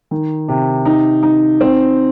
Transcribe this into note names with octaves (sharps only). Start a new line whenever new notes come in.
D#3
C3
D#4
D#4
C4